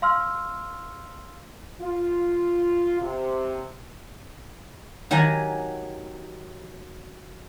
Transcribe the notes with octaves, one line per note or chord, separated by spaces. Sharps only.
F5 C6 E6 F6
F4
C3
D#3 F#3 G4 G#5 A#5